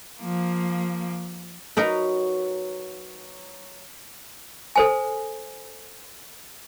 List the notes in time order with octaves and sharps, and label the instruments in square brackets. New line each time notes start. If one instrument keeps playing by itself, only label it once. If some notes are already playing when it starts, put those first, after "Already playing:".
[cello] F3 A#3
[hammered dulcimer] F#3 [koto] D#4 A#4 B4
[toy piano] A4 C5 G#5